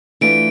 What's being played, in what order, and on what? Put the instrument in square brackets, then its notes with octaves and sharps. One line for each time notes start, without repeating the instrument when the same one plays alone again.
[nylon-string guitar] E3 A3 D4 F4 [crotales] D7